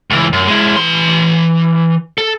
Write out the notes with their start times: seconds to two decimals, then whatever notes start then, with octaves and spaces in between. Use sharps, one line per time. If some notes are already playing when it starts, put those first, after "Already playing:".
0.10 C#2 E3
0.33 F#2
0.48 G#3 E4
0.76 E3 C6
2.18 A4